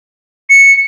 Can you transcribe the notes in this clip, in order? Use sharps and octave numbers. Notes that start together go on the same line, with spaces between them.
C#7